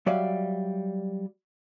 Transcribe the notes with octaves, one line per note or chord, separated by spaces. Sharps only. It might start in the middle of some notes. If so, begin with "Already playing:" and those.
F#3 G3 D5 E5 F5